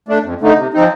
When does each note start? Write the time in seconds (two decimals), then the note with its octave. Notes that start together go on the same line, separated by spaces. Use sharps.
0.09 A3 D4
0.24 F2
0.41 D3 A3 D#4
0.57 C3
0.74 F3 C4 D#4